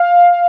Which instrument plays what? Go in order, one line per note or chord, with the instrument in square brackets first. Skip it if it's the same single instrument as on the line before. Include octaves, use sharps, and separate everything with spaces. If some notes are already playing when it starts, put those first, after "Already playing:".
Already playing: [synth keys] F5